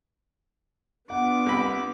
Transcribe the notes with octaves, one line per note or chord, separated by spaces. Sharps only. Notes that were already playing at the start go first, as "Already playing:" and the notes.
B3 D4 F4 F#5 D6
C2 B5